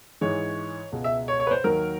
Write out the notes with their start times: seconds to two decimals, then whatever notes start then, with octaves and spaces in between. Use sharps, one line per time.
0.21 G#2 E3 G#3 C#5
0.92 C#2 B2 G#3
1.04 E5
1.28 C#5
1.40 C#5
1.47 B4
1.51 C5
1.64 D#2 D#3 F#3 A#4